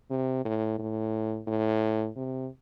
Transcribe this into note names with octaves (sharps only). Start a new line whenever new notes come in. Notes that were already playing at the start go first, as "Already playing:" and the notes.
C3
A2
A2
A2
C3